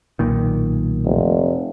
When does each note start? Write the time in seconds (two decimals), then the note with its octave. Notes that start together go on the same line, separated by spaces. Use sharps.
0.19 B1 A#2 D#3
1.04 F1